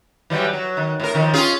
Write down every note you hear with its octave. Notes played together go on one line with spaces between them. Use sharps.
E3 F#3 G3
F#3
D#3
A2 A#4
D#3 F3
C#4 F4 G#4